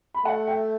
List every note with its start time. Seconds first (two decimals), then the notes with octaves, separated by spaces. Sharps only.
0.14 B5
0.25 A3 F#5 A5
0.47 E5 G5